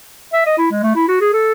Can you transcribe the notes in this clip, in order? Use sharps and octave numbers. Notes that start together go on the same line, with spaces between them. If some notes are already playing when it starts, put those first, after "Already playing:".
E5
D#5
E4
G#3
A3
E4
F#4
G#4
A4